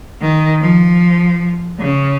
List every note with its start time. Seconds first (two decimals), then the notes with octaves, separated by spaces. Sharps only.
0.21 D#3
0.61 F3
1.79 C#3